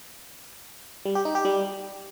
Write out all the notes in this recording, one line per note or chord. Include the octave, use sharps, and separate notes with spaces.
G3
G4
D#4
G4
G3